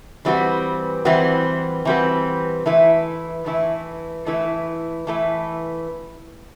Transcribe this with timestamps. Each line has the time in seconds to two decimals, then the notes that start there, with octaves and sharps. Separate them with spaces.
0.25 E3 G3 C4 F#4 B4
1.05 E3 G3 C4 F#4 B4
1.85 E3 G3 C4 F#4 B4
2.66 E3 A3 E4 B4
3.46 E3 A3 E4 B4
4.26 E3 A3 E4 B4
5.07 E3 A3 E4 B4